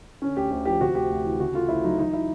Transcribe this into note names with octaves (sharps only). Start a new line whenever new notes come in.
D3 C#4
D2 G4
D2 G4
F3 G4
C3 F#4
D2 G4
D2
E3
C#3 F#4
A3 F4
D2 E4
F#3 D#4
E3 D#4
E4